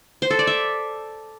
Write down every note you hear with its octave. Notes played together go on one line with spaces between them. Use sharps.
C5
A4
D5
E5